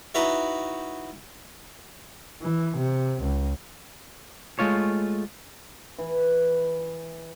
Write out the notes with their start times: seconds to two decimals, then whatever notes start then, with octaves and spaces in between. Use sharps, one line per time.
0.14 D#4 E4 F#4 B4 C#5 E5
2.42 E3
2.77 C3
3.21 C#2
4.59 G#3 A3 F4 C#5
5.99 E3